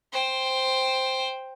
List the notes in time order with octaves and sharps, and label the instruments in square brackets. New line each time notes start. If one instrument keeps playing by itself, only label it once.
[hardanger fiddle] C5 G5